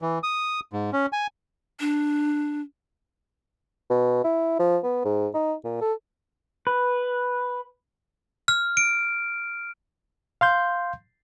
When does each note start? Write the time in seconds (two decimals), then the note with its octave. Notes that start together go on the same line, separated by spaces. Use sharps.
0.02 E3
0.23 D#6
0.73 G#2
0.93 C#4
1.13 G#5
1.80 D4
3.90 B2
4.24 E4
4.59 F3
4.84 B3
5.05 G#2
5.34 D#4
5.64 A#2
5.81 A4
6.67 B4
8.48 F6
8.77 D7
10.41 F5 C6 G6